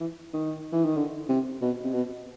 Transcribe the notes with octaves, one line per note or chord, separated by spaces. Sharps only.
E3
D#3
E3
D#3
D3
C3
B2
C3
B2